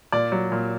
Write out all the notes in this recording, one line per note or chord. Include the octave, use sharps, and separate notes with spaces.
A#2 D5
F#3
A#2